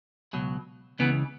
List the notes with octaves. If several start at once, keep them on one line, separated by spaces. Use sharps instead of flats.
C#2 B2 F#3
C#2 C#3 E3 B3